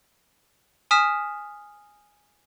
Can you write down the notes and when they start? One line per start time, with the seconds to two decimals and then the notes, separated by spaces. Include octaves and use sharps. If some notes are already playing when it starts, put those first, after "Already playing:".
0.91 G#5 D#6 F6 B6 E7